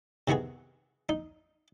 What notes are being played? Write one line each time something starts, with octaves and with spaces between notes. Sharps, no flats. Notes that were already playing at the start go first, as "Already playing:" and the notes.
C3 D#3 B3 F#4 G#4
D#4